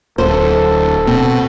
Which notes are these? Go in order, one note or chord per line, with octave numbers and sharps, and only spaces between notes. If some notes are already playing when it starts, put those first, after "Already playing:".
D1 A4 C5
B2 C4